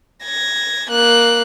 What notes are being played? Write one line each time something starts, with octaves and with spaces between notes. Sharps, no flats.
G#6 A#6
A#3 F#6